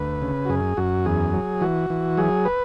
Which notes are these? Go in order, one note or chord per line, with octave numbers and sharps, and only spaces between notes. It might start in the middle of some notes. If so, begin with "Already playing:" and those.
Already playing: D2 B4
C#3
F#4
F#2 G#4
F#2 F#4
E2 G#4
F#3
E3 F#4
E3
F#3 G#4
B4